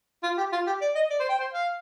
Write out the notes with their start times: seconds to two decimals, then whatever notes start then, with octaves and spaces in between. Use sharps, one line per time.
0.23 F4
0.38 G4
0.53 F4
0.67 G4
0.81 D5
0.95 D#5
1.10 D5
1.20 C5
1.29 G5
1.39 C5
1.53 F5